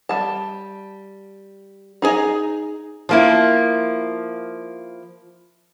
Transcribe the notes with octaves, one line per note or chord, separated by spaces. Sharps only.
G3 A5
D#4 G#4 C#5 G#5 A#5
F3 A#3 E4